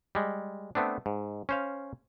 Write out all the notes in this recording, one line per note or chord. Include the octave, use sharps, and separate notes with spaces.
G3 G#3
A3 B3 C4 D4
G#2
C#4 C5 F5